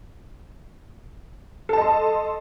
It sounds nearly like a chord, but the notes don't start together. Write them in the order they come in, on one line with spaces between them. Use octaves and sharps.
A4 A5 D#5 C6